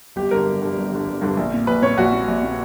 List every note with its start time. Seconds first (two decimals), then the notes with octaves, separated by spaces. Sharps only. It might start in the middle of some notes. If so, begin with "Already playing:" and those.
0.16 G1 G4
0.31 G2 D3 A#4
0.46 G1
0.62 G2 D3
0.77 G1
0.92 G2 D3
1.07 G1
1.21 G2 D3
1.37 A#1
1.53 A#2
1.67 A#1 B4
1.82 A#2 C#5
1.97 A#1 F#4
2.12 A#2
2.28 A#1
2.43 A#2